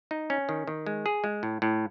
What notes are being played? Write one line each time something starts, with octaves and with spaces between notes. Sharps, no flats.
D#4
C#4
D#3
D#3
G#3
G#4
G#3
A2
A2